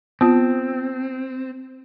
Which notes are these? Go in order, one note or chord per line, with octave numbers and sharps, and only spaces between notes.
B3 C4 F4